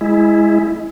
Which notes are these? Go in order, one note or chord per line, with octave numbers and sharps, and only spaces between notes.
G#3 E4